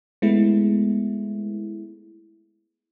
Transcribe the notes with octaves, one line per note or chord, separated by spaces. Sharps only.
G#3 A3 B3 E4